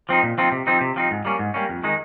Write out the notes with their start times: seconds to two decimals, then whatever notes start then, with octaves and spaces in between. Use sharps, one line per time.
0.09 F3 C4 D#4
0.23 A#2
0.38 F3 C4 D#4
0.52 C3
0.67 F3 C4 D#4
0.81 C3
0.96 F3 C4 D#4
1.11 G#2
1.25 G3 A#3 C#4
1.39 G#2
1.54 G3 A#3 C#4
1.69 F2
1.84 D#3 G#3 D#4